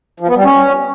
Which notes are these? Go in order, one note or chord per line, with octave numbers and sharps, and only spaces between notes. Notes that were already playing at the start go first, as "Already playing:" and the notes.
F3
B3
G3
C#4